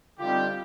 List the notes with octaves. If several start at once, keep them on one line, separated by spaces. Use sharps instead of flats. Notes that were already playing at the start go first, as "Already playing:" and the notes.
D3 G3 C4 D#4 F4 G4